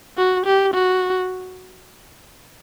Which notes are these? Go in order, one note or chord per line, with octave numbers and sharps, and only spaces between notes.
F#4
G4
F#4